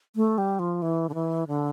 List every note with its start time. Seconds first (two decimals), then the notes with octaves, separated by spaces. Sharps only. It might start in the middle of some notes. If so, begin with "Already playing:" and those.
0.16 A3
0.38 G3
0.59 F3
0.82 E3
1.09 D3
1.14 E3
1.48 D3